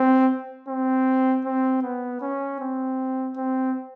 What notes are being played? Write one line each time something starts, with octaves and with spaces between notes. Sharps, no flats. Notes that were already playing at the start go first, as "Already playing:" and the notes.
Already playing: C4
C4
C4
B3
C#4
C4
C4